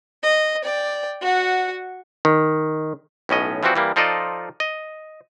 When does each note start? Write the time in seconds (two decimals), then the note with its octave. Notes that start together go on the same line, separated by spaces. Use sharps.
0.23 D#5
0.64 D5 G5
1.21 F#4 F#5
2.25 D#3
3.29 B1 A2 C#4 D#5
3.63 E3 F3 G3 C4 F#4
3.75 E3 G3 A#3
3.96 F3 D#4 F4 A4 D5 D#5
4.60 D#5